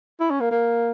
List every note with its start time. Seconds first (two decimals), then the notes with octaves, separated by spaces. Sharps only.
0.20 E4
0.31 C#4
0.40 A#3
0.51 A#3